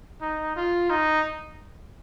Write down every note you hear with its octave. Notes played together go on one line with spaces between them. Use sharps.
D#4
F4
D#4